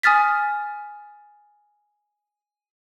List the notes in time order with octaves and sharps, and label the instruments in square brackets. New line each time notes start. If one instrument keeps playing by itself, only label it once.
[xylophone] G#5 D#6 F6 A6 B6